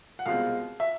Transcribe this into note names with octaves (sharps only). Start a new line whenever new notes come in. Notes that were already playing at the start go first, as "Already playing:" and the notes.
F#5
C2 B2 G#3 C4 F4 F5
E5